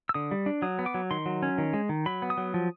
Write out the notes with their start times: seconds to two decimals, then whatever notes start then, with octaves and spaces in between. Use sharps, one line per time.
0.09 E6
0.14 D3 D#6
0.31 G3
0.46 D4
0.62 F#3 D#6
0.79 B3
0.86 D6
0.94 F#3
1.11 D#3 C6
1.26 F#3
1.43 C#4
1.58 D#3
1.73 G#3
1.89 D#3
2.06 F#3 B5
2.22 B3
2.30 D#6
2.37 F#3
2.54 F3